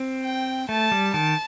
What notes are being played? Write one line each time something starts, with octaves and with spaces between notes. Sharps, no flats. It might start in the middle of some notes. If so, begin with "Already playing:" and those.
Already playing: C4
G5
A3 A5
G3
D#3 A5